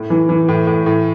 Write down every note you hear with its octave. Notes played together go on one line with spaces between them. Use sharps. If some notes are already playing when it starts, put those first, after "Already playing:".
Already playing: A2
E3
E3
A2
A2
A2